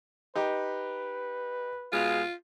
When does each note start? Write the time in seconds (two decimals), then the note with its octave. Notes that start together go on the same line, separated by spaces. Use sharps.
0.35 D#4 G4 B4
1.92 B2 G#3 F4 F5